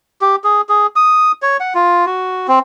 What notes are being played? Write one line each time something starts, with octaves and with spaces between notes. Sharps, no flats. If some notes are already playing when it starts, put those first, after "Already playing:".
G4
G#4
G#4
D#6
C#5
F#5
F4
F#4
C4